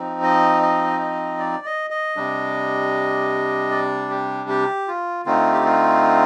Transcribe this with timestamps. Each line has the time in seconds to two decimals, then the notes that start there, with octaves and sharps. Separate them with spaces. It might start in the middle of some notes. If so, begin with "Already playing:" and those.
Already playing: F3 C4 D#4
0.23 D#5
0.63 D#5
1.01 D#5
1.39 D5
1.66 D#5
1.90 D#5
2.16 C3 G3 D4
3.71 D5
4.10 G4
4.49 G4
4.88 F4
5.26 D3 A3 C4 D#4 F4
5.53 G4
5.65 F4